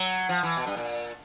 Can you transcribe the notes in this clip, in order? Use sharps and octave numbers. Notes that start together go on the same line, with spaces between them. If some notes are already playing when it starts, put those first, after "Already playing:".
Already playing: F#3
F3
E3
B2
G2
A#2